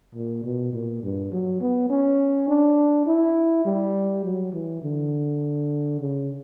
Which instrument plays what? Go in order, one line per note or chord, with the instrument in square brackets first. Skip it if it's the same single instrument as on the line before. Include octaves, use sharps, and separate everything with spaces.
[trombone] A#2
B2
A#2
G2
F#3
B3
C#4
D4
E4
G3
F#3
E3
D3
C#3